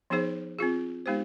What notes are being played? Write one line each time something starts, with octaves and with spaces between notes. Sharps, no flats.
F3 B3 D#4 G#4 C5
C4 F4 G#4
G#3 B3 D#4 G4 C5